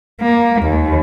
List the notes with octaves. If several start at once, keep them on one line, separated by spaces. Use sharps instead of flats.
A#3
D#2